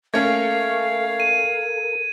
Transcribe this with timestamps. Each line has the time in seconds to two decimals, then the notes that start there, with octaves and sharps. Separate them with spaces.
0.14 A3 A#3 C#4 A4 A#4 F5 G#6
1.20 D#7